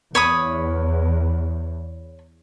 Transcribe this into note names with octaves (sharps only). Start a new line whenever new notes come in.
E2 C#5 B5 D#6